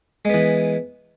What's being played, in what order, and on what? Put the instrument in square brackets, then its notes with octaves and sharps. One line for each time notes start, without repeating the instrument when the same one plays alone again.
[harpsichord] G#3
B3
E3